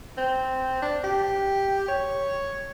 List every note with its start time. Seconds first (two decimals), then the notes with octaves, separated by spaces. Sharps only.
0.17 C4
0.82 D4
1.04 G4
1.88 C#5